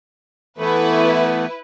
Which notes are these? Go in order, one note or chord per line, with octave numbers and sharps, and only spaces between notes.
E3 A3 B3 E4 B4